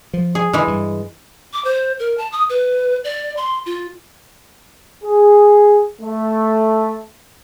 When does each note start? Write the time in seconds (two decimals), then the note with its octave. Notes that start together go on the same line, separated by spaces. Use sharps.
0.14 F3
0.35 G#4
0.53 D3 E3 G#3
0.68 G2
1.53 D6
1.65 C5
1.99 A#4
2.18 A5
2.32 D#6
2.50 B4
3.04 D5
3.37 C6
3.66 F4
5.04 G#4
6.01 A3